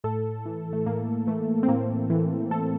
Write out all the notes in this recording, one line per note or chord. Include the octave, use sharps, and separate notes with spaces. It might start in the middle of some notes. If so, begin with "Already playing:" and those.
A2 A4
E3
A3
A2 A#3
E3 A3
C4
A2 A#3
E3
A2 A4